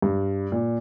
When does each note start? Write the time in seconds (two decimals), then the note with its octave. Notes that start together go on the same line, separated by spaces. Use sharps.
0.02 G2
0.52 A#2